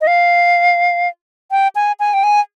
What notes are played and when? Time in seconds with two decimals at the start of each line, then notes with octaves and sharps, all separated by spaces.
0.01 D#5
0.07 F5
1.51 G5
1.75 G#5
2.00 G#5
2.14 G5
2.24 G#5